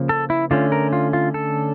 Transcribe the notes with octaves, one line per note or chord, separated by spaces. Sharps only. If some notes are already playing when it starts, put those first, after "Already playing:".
Already playing: C#3 F3 A#3
A4
E4
D3 A3 C#4 F4
A#4
F4
F4
A4